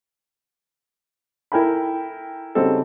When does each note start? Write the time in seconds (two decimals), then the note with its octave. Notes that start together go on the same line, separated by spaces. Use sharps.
1.52 E4 A4 A#4 G5 G#5 B5
2.55 C#3 G3 C4 D#4 F#4 A4